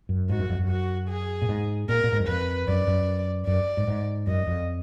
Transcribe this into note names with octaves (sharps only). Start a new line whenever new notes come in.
F#2
G#2 F#4
F#2
F2
F#2
F#4
G#4
A#2
G#2
A#2 A#4
A#2
G#2
F#2
F2 B4
F#2 D5
F#2
F#2 D5
G#2
G#2
F#2 D#5
F2